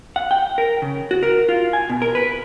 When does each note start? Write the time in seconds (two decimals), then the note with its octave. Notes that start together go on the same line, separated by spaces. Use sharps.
0.16 F#5
0.31 G5
0.58 A#4
0.82 C#3
1.11 F#4
1.23 A#4
1.49 F4
1.73 G#5
1.90 B2
2.02 A#4
2.15 B4